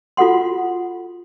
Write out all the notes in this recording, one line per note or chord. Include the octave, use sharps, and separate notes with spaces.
F4 F#4 A4 F#5 C6